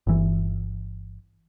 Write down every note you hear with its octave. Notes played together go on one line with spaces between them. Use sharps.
G1 E3